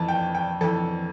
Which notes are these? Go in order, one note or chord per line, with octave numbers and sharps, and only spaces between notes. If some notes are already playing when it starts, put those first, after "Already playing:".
Already playing: F2 E3 A5
G5
G5
F2 E3 A4